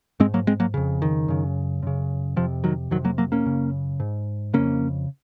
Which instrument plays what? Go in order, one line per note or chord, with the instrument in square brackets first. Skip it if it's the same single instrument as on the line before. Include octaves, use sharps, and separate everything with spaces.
[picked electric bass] G#2 G#3 C4
F#3 A#3
G#3 C4
F#3 A#3
F2 C#3
D#3
F#2 C#3
F#2 C#3
F2 C3 F3
D#3 F#3
F2 C3 D#3 F#3
F#3 A#3
F#3 A#3
A#3 C#4
F#2 C#3
G#2
F2 C#3 A#3 C#4